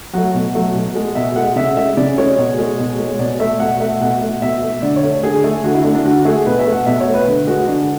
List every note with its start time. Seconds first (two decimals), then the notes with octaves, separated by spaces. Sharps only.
0.13 F#3 A3 F#4
0.34 B2
0.55 F#3 A3
0.75 B2
0.95 G#3
1.15 B2 E5
1.36 G#3 F#5
1.56 C#3 E5
1.77 G#3 E5
1.97 C#3 D5
2.18 G#3 C#5
2.38 B2
2.59 G#3
2.78 B2
2.99 G#3
3.19 B2 D5
3.40 A3 E5
3.60 B2 F#5
3.80 A3 E5
4.01 B2 F#5
4.21 A3
4.42 B2 E5
4.62 A3
4.82 D3 D5
4.96 C#5
5.03 A3
5.23 D3 G#4
5.44 A3
5.64 D3 F#4
5.74 E4
5.85 A3 D4
5.95 D4
6.05 D3 F#4
6.25 A3 G#4
6.46 B2 B4
6.59 E5
6.66 A3
6.72 F#5
6.86 B2 E5
7.00 C#5
7.07 A3
7.14 B4
7.28 D3
7.47 G#3 F#4
7.68 D3 D4